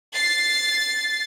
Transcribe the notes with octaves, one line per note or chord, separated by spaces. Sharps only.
A6 C7